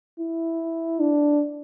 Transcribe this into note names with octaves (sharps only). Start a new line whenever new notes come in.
E4
D4